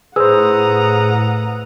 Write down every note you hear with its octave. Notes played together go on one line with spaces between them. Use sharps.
A2 G#4 B4 C5 F#5 A#5 D#6 E6